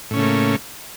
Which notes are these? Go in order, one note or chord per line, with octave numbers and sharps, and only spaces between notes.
A2 C#3 A3 A#3 C#4